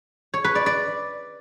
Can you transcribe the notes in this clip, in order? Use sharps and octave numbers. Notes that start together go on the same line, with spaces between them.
C#5
B4
D5
D5